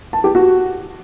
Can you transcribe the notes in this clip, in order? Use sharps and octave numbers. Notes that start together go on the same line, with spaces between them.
A5
G4
F#4